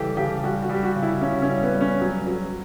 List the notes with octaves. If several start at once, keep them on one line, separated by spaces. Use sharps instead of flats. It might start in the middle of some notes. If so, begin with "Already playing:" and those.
Already playing: C#3 E3 G3 G4 A4
C#3 G4
G3 F#4
F#4
G3 G4
F#4
C#3
E4
C#3 C#4
C#4
G3
B3
G3
C#4
F#3
F#3